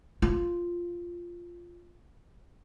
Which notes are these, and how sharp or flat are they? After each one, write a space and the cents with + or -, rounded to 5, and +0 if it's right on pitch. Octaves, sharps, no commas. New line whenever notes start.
F4 -5